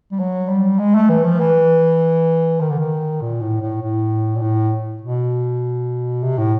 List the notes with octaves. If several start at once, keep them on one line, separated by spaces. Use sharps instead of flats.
G3
F#3
G3
G#3
A3
E3
F3
E3
D#3
D3
D#3
A#2
A2
A2
A2
A#2
A2
B2
C3
A2